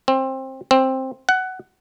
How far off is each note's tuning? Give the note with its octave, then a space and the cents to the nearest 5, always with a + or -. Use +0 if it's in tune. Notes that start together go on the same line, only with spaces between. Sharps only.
C4 +20
C4 +10
F#5 +15